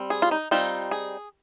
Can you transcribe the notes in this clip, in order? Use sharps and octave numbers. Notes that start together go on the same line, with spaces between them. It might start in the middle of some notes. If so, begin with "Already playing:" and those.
Already playing: G3 C4
G#4
F4
D#4
G3 C4 D#4 F4
G#4